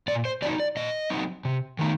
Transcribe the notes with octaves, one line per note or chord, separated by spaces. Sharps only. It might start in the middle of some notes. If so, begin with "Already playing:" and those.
A#2 D5
C5
F#3 C4 D#4 D5
D5
A#2 D#5
F#3 C4 D#4
C3
D#3 A3 D#4